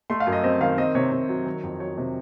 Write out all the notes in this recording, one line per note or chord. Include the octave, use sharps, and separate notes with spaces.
A3 C6
F5
F#2
D#5
C4 D#5
D#3 F5
C4 D#5
C3 C#5
C3
F#3
D#3
F2
F#3 C#5
C3